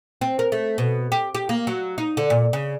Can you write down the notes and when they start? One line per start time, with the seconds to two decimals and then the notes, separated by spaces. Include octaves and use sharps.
0.21 C4
0.39 A#4
0.52 A3
0.78 B2
1.12 G4
1.35 G4
1.49 A#3
1.67 F#3
1.98 D#4
2.17 D3
2.30 A#2
2.53 C#3